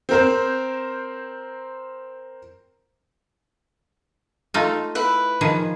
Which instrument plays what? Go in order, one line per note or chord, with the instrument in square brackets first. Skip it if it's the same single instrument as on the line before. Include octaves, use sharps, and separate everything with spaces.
[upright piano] C4 A#4 C5
[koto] A3 D#4 F4
[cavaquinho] E4 B4
[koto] D#3 F3 G#4